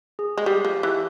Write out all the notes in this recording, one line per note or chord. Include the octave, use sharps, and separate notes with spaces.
G#4
G#3
G3 G4
F3
E3